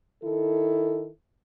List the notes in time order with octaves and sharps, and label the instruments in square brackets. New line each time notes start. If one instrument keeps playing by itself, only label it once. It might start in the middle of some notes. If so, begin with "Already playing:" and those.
[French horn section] D#3 E4 A4